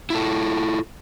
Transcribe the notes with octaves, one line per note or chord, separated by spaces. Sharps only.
E4 F4 A4